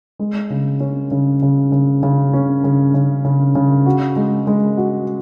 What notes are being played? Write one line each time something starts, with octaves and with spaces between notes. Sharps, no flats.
G#3
C#3
C#4
C#3
C#3
C#3
C#3
C#4
C#3
C#3
C#3
C#3
F#4
G#3
G#3
F#4